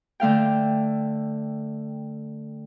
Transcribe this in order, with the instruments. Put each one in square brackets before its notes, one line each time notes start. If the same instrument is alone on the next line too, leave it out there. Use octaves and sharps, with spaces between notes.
[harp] D3 A3 F5 G5